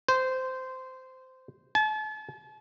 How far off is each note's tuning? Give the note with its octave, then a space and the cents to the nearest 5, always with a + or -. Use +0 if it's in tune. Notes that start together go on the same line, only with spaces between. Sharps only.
C5 -15
A5 -40